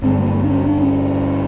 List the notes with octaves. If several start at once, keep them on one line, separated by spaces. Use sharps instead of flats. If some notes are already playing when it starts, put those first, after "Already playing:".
G2 D3 C4
A#3
A#3
D4
C#4
D4
C#4